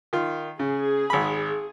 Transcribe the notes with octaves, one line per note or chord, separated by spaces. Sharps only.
D#3 F4
C#3 G#4
G#1 B5